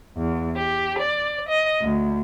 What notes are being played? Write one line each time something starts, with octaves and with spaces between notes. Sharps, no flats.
E2
G4
D5
D#5
D2